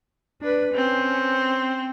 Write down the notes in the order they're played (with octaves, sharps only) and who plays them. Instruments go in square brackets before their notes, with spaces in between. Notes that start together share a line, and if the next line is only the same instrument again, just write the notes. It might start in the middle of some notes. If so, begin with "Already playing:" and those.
[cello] D4 B4
[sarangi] C4 [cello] C#4